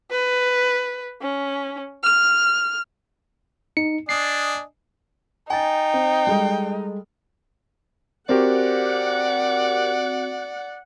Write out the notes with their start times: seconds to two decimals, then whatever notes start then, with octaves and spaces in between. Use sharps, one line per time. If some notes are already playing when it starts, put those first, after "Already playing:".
0.11 B4
1.22 C#4
2.04 F6
3.77 D#4 C#7
4.09 D4 D#5 G#5 C7
5.50 D#4 G5 G#5 A6
5.94 C4
6.27 G3 G#3 A4
8.29 C4 F#4 G4 A#4 C5 D5 F#5